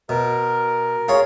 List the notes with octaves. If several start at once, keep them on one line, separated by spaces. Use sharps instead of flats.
B2 A#4
F4 G#4 C#5